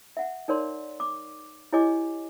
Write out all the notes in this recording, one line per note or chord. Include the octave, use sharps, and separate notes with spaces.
E5 F#5
D#4 A#4 C#5 D5 C6
D6
E4 G4 C#5 D#5 G#5 D6